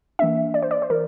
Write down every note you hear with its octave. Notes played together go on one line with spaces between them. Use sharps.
E3 A#3 D4 E5
D5
C5
D5
C5
E3 A#4